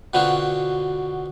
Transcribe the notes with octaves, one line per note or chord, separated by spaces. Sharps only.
B2 D3 B3 C4 F4 F#4